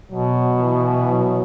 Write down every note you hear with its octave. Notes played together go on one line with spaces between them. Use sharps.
B2 F#3
E3
F#3